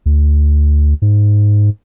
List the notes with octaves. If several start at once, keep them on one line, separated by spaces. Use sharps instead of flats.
D2
G#2